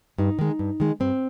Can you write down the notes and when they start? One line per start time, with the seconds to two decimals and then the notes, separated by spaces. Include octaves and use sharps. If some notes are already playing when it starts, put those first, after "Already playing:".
0.18 G2 D#4
0.39 D#3 G#3
0.59 G2
0.80 D#3 G#3
1.00 G2 C4